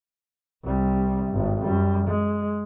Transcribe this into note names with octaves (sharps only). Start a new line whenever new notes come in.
C2 G3
G#1 G2
F#2 G3
G#3